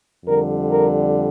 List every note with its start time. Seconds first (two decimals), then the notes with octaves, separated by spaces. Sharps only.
0.25 F2 D3 G3 A#4
0.71 A#4